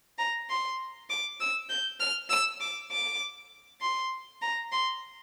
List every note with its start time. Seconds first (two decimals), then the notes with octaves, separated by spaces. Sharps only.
0.18 A#5
0.49 C6
1.10 D6
1.40 E6
1.69 G6
2.00 F6
2.29 E6
2.61 D6
2.91 D6
3.81 C6
4.42 A#5
4.72 C6